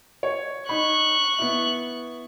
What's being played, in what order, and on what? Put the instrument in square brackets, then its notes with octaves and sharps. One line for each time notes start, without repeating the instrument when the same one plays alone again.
[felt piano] C#5
[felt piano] D#4 B5 [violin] C#6 F#6
[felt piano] B3 E4